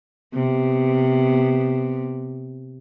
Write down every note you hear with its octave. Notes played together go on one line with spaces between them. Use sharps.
C3 B3